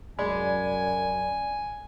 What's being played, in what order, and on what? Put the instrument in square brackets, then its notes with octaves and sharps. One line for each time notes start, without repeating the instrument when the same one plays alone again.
[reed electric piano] C2 D5 B5 [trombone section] F#2 [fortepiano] G#3 [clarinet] G#5